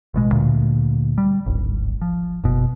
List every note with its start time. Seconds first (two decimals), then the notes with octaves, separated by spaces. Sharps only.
0.14 A1 B2 G#3
0.32 D2 A#2
1.18 G3
1.46 D1 G#1
2.01 F3
2.44 F#1 B2